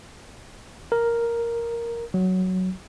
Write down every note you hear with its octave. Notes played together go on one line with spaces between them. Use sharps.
A#4
F#3